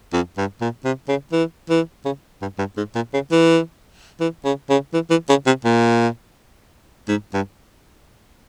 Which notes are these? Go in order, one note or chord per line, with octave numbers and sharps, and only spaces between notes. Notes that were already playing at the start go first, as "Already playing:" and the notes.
F2
G2
A#2
C3
C#3
E3
E3
C#3
G2
G2
G#2
A#2
C#3
E3
E3
C#3
C#3
E3
E3
C#3
C3
A#2
G#2
G2